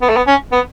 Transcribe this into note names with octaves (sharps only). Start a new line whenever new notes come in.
B3
A3
B3
C#4
B3